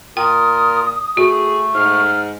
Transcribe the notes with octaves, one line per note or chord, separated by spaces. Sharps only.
A#2 F4 A#4 G5 D#6
A3 F#4 G#4
G#2 F6